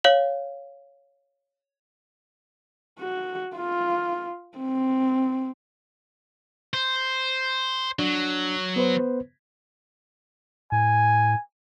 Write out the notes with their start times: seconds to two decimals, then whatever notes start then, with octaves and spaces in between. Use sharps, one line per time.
0.04 C#5 F5 F#7
3.00 F#4
3.56 F4
4.57 C4
6.74 C5
7.99 F#3 D4
8.76 B3 B4 C5
10.72 A2 G#5